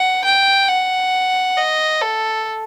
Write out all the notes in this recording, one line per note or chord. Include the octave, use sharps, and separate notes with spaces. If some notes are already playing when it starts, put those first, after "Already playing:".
Already playing: F#5
G5
F#5
D#5
A4